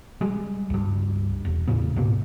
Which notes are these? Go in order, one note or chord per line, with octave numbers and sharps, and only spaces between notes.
G3 G#3
C#2 G2
E1
E2 A2 C#3 B3
D2 G#2 B2 A#3